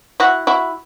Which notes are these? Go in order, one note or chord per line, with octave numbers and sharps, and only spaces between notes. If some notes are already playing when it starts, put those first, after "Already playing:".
E4 F#4
E4 F#4